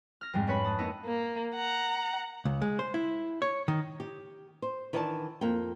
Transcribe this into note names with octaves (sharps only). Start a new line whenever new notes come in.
F6 A#6
F2 G#2 G3 G#3
C#4 D4 B4 C#5 B5
A5 D#6
A#3 B3 D#4 D#5 E5
A#3
F#5 A#5
C#2
G#3
C5
E4
C#5
D#3
G4
C5
D#3 E3 D4 D5 E5 A5
F2 A#3 G5